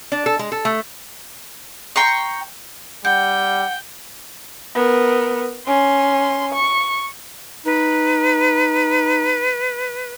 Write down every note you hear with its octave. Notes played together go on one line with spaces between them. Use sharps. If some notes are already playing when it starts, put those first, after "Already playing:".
D4
A4
G#3
A4
A3
G5 A#5 C6 C#6
G3 F#5 G5 G6
B3 A#4
C#4 C6
C#6
D#4 B4